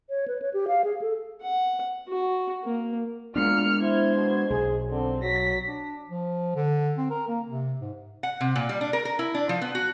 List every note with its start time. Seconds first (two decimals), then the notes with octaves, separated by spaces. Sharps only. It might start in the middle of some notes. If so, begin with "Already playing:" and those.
0.10 C#5
0.28 B4
0.42 C#5
0.54 G4
0.68 F5
0.84 G#4
1.02 A4
1.41 F#5
2.09 F#4
2.64 A#3
3.36 A#2 G#3 B3 D4 F6 C#7
3.81 E4 C5 G#6
4.15 B2
4.50 B1 G#4
4.91 D3 C4
5.22 F#3 A#6 B6
5.68 D4
6.10 F3
6.56 D3
6.98 C4
7.11 A#4
7.28 A#3
7.49 C3
7.82 G#2
8.23 F#5
8.41 C3
8.56 A#2
8.69 G3
8.81 D4
8.93 A#4
9.05 A#4
9.19 E4
9.35 D4
9.49 F3
9.62 B3
9.75 F#4